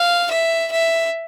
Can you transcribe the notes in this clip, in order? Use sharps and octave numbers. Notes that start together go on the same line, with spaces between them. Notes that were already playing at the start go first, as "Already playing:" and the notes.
Already playing: F5
E5
E5